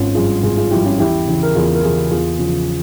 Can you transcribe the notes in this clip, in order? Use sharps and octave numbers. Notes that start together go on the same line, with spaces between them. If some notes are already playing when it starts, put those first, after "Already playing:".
Already playing: G#1 C#4 F4
G2 F3 F4 G#4
G#1 F4 G#4
F4 G#4
G2 F3 E4 G4
C#4 F4
E2 E4 G4
C#3 E3
A#4
E2 F4 G#4
A#4
C#3 E3 F4 G#4
E2 F4 G#4
C#3 F3